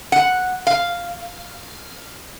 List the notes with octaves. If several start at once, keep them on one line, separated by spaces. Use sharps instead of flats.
F#5
F5